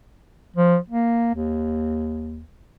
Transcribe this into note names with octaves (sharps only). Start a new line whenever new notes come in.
F3
A#3
D#2